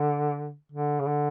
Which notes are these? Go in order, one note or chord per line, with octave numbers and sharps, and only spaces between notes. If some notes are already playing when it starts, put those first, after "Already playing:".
Already playing: D3
D3
C#3
D3